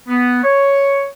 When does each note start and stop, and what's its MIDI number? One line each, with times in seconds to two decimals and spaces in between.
0.08 0.43 59
0.44 1.06 73